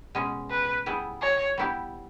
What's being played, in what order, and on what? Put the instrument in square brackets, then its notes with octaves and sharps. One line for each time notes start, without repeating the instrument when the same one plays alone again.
[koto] B2 G#3 C#4 G#4
[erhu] B4
[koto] G3 B3 E4 G#4
[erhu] C#5
[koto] G3 B3 E4 G4